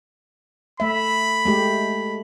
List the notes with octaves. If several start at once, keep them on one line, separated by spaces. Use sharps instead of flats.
A3 E5 B5
G#3 A3 G4